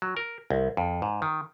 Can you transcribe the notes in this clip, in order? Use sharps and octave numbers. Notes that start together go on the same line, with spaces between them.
F#3
A#4
C2
F2
G#2
D#3